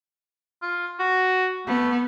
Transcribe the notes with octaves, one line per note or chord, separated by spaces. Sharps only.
F4
F#4
A3 B3